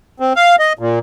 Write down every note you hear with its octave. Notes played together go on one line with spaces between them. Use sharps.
C4
F5
D#5
A#2